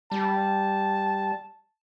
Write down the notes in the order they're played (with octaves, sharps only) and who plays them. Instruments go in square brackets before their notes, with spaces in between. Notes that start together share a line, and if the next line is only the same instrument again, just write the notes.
[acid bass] G3 [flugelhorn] A5